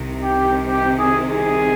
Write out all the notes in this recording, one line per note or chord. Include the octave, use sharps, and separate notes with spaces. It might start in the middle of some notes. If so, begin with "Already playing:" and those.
Already playing: C2 C3 D#3
G4
G4
G#4
G#4